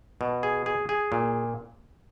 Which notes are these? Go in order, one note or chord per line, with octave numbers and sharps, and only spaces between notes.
B2
G#4
G#4
G#4
A#2